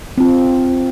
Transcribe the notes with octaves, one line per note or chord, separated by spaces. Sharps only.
C4 F4